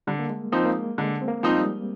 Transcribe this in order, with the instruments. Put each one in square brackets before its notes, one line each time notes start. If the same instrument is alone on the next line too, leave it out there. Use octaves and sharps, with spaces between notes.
[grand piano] D3 [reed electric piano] G3
[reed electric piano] A#3
G#3
[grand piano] F3 C4 D#4 [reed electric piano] A#3
[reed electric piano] A#3
G#3
[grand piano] D3 [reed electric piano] G#3
[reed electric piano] C4
A#3
[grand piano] F3 C4 D#4
[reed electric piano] G3